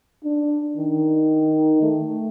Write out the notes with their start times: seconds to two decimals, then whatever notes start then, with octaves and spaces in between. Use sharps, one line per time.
0.24 D4
0.77 D#3
1.82 A3